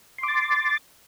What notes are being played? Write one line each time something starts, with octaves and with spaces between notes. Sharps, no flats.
C6 D6 A6